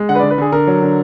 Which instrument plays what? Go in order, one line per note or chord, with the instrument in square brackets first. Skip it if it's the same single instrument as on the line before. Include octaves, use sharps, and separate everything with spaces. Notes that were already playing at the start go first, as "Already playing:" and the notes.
Already playing: [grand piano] G#3
D3 F#5
B4
D5
D3
B4
D3 G#4
D3 A#4
F#3
D3